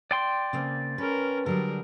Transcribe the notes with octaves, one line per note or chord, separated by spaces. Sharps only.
D5 G5 C6
C#3 A#3 C4
C#4 A#4 B4
D3 F#3 G3 G#4 A#4